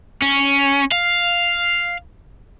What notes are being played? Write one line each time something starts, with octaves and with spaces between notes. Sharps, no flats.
C#4
F5